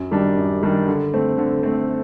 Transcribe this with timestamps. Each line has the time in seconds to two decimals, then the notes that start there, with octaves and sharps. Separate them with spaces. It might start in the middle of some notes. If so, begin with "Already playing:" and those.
Already playing: F#2
0.11 D#3 G3 D4
0.38 F#2
0.63 D#3 G3 D4
0.88 D3
1.14 A3 C4
1.38 D3
1.63 A3 C4